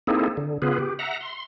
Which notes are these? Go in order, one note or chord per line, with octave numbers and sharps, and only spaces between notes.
A#3 C4 D#4 E4 G#4 A4
D3
C#3 B3 F4 G#4 B4
G4
E5 F#5 A#5
C6